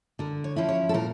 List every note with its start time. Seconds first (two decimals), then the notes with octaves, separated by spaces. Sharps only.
0.19 D3 A#4
0.44 C#5
0.56 F3 C#4 E4
0.69 C#5
0.89 A4
0.94 A#2 A#4